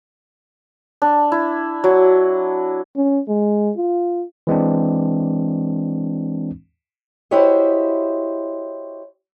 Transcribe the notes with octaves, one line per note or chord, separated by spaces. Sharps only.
D4
E4
F#3
C#4
G#3
F4
E3 G#3 C4 D4
E4 F#4 G4 C5 C#5 D#5